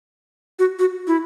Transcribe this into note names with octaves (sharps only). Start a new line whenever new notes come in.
F#4
F#4
E4